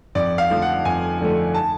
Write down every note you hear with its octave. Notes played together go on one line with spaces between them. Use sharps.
F2 D5
F5
D3 F3 A3
F#5
F2 G#5
D3 F3 A3
A5